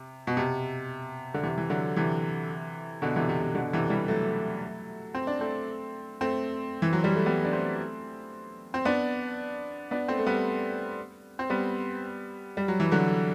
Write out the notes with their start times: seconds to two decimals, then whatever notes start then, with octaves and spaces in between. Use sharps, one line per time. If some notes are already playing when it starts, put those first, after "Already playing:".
Already playing: C3
0.27 B2
0.37 C3
1.34 D3
1.43 C3 E3
1.58 E3
1.70 D3 F#3
1.96 C3 E3
3.02 B2 D3
3.16 C3 E3
3.29 C3
3.42 C3
3.55 B2 D3
3.73 C3 E3
3.90 E3 G3
4.08 F#3 A3
5.15 C4
5.27 D4
5.40 A3 C4
6.21 A3 C4
6.82 E3
6.93 F#3
7.04 G3
7.15 A3
7.26 G3 B3
7.45 D4
7.53 A3 C4
8.74 C4
8.85 B3 D4
9.91 B3 D4
10.08 A3 C4
10.19 A3
10.26 G3 B3
11.39 C4
11.50 G3 B3
12.57 G3
12.68 F#3
12.80 E3
12.92 D3 F#3